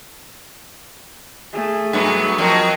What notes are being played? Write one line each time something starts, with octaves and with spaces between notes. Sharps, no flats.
A3 G#4
G2 F#3 B3
F3 F#3 C4 A#4 D#5